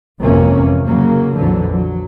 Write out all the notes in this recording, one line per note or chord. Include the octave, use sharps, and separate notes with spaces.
G#1 F2 C3 E3 A#3 C#4
C#3 F#3 A#3
A#1 F2 D3 E3 F#3
F#3